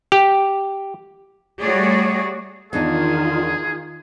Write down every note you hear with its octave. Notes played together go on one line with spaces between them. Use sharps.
G4
G3 A3 F#4 G#4 C#5 D5
E2 D#3 D4 D#4 F4 G#4